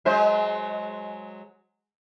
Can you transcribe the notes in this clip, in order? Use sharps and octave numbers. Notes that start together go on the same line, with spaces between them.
F#3 G#3 C5